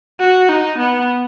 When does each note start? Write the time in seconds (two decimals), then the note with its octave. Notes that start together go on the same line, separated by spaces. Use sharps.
0.20 F#4
0.49 D#4
0.79 B3